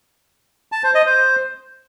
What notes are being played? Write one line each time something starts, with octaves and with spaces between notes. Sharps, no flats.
A5
C5
D#5
C5